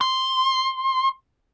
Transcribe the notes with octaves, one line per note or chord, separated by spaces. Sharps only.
C6